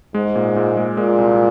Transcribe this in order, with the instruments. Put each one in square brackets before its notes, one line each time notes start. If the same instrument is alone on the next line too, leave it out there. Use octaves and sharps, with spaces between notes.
[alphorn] G#2 [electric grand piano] G#3
[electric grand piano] A#2
A#2
G#3
[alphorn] A#2 [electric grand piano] G#3
[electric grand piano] C2